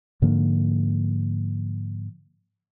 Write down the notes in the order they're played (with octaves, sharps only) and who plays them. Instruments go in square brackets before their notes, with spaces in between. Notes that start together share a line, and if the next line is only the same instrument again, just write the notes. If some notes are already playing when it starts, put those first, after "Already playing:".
[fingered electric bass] G#2 D3 F3 A#3